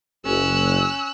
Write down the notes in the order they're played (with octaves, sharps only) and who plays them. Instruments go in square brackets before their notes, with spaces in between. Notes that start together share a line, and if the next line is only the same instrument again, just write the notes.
[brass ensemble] F#1 [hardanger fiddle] C#4 [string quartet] E6 F#6